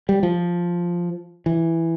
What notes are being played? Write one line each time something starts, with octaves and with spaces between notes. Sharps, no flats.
G3
F3
E3